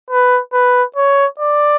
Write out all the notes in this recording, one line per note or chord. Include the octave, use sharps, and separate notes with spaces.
B4
B4
C#5
D5